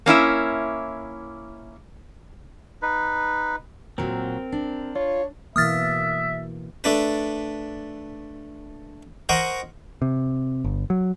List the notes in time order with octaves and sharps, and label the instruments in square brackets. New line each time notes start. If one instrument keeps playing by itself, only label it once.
[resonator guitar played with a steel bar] A#3 C#4 E4 E5
[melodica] D#4 B4
[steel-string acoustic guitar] A#2 F#3 [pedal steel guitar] C4 A#4
[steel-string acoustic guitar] D4
[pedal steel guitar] F4 [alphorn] C#5
[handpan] B2 E3 A#3 [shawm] E5 [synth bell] D#6 F6 A6
[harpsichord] A3 D4 B4
A#4 C5 D#5 F#5 C#6
[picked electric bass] C3
G1
F#3